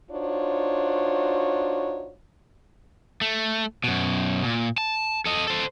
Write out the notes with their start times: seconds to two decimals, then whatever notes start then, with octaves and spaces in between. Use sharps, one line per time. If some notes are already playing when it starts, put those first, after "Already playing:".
0.11 D4 D#4 F4 F#4 C5 C#5
3.21 A3
3.84 F#2 B2
4.44 A#2
4.78 A5
5.26 A4 D#5
5.48 A4 C5